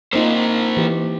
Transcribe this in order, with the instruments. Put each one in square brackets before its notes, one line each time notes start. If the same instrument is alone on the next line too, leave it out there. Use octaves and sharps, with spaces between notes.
[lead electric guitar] A#3 C5 [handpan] C4 D#4 F4
[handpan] E3 G4